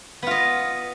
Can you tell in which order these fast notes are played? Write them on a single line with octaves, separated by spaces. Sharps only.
B3 F4 D#5